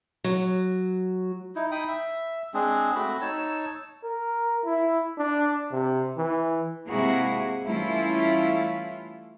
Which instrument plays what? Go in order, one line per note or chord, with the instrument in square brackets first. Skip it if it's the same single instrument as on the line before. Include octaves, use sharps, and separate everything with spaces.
[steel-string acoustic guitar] F#3
[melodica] D#4 E4
D#4 G5 B5 D#6
E5
G#3 C4 D4 G#4
A3 C4 F#4 B5
D#4 C#5 A5 E6
[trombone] A#4
E4
D4
C3
E3
[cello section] C3 G#3 A#3 E4 F#4 G#4
E3 G3 A3 C#4 E4 F4